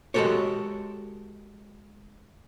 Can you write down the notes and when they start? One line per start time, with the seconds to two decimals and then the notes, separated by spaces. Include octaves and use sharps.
0.14 G#3 F#4 G4 A4 A#4 C#5